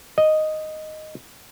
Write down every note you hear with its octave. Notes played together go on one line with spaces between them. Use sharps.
D#5